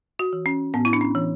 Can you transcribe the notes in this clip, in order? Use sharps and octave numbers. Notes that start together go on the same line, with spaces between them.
F#4
E3
C#4
A2 B3
E4
D4
C#4
E3